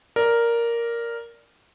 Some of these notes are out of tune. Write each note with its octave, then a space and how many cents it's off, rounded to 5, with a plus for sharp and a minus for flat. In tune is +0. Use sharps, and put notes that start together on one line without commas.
A#4 +0 D5 -10